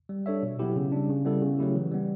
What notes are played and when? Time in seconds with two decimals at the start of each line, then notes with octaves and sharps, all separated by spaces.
0.09 G3
0.26 D4 A4 C#5 E5
0.43 B2
0.59 F#3 B3 E4 G4
0.76 C#3
0.92 G3 D4
1.09 C#3
1.25 G3 B3 E4 A4
1.42 C#3
1.59 F#3 A3 E4 G4
1.75 E3
1.91 G3 B3